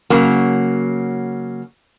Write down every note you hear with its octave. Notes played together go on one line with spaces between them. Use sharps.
C#3 F#3 A#3